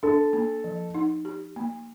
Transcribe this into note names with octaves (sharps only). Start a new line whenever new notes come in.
D4 A4
A#3
F3
D#4
G4
A#3